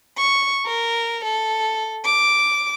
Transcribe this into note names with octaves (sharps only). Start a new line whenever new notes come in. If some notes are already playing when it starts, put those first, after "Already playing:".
C#6
A#4
A4
D6